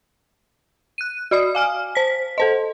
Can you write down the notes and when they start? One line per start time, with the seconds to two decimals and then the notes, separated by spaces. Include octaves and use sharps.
0.98 F#6 D#7
1.31 F#4 D5 D#6
1.55 F5 G#5 F6
1.95 C5 B6
2.38 A4 C5 D#5